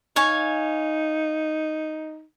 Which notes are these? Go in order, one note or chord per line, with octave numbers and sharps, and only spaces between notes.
D#4 C#5 F5 G#5